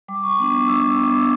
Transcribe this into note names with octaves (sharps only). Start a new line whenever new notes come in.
G3 D6
C#6
B3 D4 D6
D6
G3 E6
E6
B3 D4 D6
E6